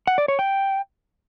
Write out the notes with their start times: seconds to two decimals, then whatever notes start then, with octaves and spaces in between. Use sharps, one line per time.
0.07 F#5
0.18 D5
0.28 C#5
0.39 G5